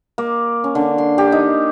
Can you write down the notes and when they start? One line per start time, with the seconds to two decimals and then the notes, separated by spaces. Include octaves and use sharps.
0.18 A#3
0.64 C#4
0.75 D3
0.98 C6
1.18 G4
1.32 D#4